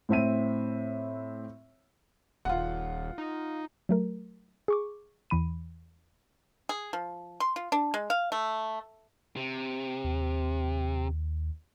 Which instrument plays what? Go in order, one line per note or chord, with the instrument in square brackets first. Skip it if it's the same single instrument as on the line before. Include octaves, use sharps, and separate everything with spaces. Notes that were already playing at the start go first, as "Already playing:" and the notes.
[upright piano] A2 C4 E5 D#7
[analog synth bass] D#1 [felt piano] F4 F#5
[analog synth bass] D#4
[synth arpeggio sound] F#3 A3 A#4
G#4 C#6 D6
E2 E3 B5 D#7
[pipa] G#4
F3
C6
F4
D4
G#3
F5
A3
[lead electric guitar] C3
[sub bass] D#2